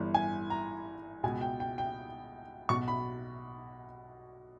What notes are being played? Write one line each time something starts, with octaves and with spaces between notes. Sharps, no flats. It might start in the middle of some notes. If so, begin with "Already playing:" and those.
Already playing: G1 G2 E3
G#5
A#5
C#2 B2 G#5
G5
G5
G5
B1 B2 C#6
B5